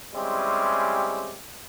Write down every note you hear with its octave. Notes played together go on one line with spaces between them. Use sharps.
G3 G#3 C4 C#4 E4 G4